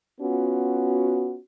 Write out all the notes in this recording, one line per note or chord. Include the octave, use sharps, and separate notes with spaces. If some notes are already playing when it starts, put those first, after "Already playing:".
B3 C#4 F4 F#4